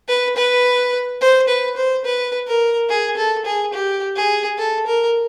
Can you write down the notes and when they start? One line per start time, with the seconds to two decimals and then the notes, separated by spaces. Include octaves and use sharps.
0.08 B4
0.36 B4
1.21 C5
1.48 B4
1.76 C5
2.05 B4
2.47 A#4
2.89 G#4
3.17 A4
3.45 G#4
3.73 G4
4.16 G#4
4.58 A4
4.86 A#4